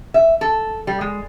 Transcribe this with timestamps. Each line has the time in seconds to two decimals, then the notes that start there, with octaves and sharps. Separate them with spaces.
0.14 E5
0.41 A4
0.87 G3
1.01 G#3